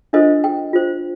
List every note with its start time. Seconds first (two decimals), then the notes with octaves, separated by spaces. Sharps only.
0.13 D4 F4 A4 C5 D#5
0.44 G5
0.73 F4 C5